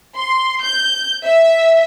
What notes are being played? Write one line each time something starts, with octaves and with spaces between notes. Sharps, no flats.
C6
G6
E5